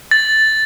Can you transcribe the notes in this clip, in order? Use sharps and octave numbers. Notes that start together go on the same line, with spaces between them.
A6